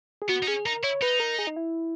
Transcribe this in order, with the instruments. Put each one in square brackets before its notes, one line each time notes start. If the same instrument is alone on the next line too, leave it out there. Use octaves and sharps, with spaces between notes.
[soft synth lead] G#4
[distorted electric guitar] B3 [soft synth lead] F#4
[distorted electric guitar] D#4
[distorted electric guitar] C#4 [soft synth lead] G#4
[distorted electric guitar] D#4 [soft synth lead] A#4
[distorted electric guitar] E4 [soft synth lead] C#5
[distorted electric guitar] D#4 [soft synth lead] B4
[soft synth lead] A#4
G#4
D#4
E4